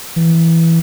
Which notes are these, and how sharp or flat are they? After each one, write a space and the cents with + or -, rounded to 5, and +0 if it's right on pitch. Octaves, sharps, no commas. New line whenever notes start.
E3 +0